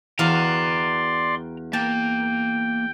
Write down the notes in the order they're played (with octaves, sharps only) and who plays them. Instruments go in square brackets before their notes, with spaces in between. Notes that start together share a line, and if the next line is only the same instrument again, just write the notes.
[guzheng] E2 F#4 F5 [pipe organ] D5 C6 [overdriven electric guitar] G5 A#5
[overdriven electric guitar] A#3 [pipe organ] G5 [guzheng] A5